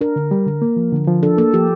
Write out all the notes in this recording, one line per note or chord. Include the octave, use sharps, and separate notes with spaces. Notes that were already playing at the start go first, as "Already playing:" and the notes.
D4 A#4
D3
G3
D3
A#3
F3
D3
F3
D4 A4
A#3 A4
F3 G4